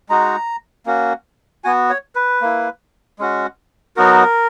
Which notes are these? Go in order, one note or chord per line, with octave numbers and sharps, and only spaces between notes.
G#3 D#4 F#4 A#5
A#3 C#4 F#4
B3 F#4 G#5
C#5
B4
A#3 E4
G#3 C#4 F#4
F#3 B3 D#4 F#4 A#4